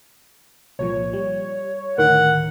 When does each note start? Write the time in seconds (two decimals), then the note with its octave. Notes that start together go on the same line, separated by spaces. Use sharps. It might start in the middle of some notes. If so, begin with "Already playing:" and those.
0.79 C2 A#2 F3 C#5
1.13 G3
1.98 D2 A2 D#3 A#4 F#5